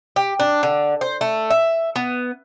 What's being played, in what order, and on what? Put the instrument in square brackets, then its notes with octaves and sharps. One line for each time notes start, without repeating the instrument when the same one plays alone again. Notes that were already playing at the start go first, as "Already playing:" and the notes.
[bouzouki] G4
D4
D3
C5
A3
E5
B3